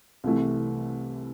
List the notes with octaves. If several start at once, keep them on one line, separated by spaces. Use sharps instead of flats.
C2 C3 E3 A3